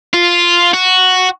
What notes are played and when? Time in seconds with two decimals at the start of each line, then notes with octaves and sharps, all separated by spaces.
0.14 F4
0.74 F#4